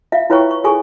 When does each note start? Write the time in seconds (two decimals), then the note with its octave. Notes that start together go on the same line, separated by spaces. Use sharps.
0.12 F4 E5 F5
0.30 E4 F4 B4 C#5 G5 C#6
0.51 C#6
0.64 F4 G#4 A4 G#5 C#6